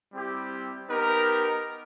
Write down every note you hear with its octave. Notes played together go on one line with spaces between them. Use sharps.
G3 C4 E4 G4
B3 D#4 G4 A#4